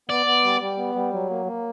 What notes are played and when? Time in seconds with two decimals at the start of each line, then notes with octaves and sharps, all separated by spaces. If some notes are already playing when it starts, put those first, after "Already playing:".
0.09 B3 D5
0.26 B3
0.44 G3
0.61 G3
0.77 B3
0.95 G3
1.13 F#3
1.30 A#3
1.46 A#3